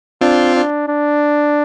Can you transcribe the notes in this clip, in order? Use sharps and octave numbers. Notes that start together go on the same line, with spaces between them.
C4 D4 F4
D4
D4